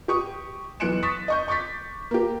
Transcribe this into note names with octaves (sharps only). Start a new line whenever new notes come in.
G4 C#6 D#6
B1 E3 F#6 C#7 D7 E7
C#6 D#6 A6 B6
D#5 C#6 G6
C#6 D6 A6 B6
A#3 G4